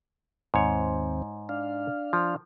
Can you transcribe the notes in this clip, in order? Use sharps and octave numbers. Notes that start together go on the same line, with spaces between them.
D#2 G#2 C4 C#5
D4 F5
F3